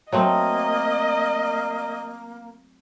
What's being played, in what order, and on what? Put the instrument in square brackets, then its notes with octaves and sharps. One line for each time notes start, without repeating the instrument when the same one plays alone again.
[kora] F#3 A3 C4 [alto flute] A#3 [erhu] D#5